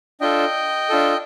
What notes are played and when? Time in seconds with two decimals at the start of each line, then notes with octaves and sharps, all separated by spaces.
0.21 D4 F4 A4 D#5 G5
0.90 D4 F4 A4